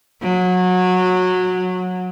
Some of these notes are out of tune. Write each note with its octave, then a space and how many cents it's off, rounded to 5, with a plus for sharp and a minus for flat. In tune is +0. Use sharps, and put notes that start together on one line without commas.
F#3 -20